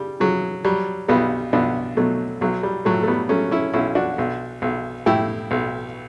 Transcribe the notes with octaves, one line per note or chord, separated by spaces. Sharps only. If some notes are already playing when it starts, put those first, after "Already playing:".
Already playing: C#3 G3
C#3 F#3
F#3 G3
B1 G3 B3
B1 B3 D4
B2 F#3 A3
B1 F#3
G3
A2 F#3 A3
A3
G3 B3
F#3 A3 C#4
C#4 E4
B1 C#4 E4
D4 F#4
B1
B1
A2 E4 G4
B1